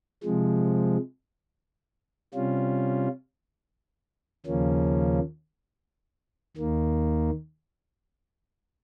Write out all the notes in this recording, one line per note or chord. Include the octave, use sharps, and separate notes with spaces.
C3 F3 G#3
C3 G3 C#4 F4
D#2 C#3 F3 A#3 C#4
D#2 D#3 A#3